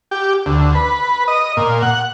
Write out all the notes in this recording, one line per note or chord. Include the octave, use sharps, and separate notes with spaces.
G4
D2
B4
D#5
A#2
F#5